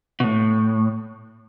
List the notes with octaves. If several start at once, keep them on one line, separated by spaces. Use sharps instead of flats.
B2
A2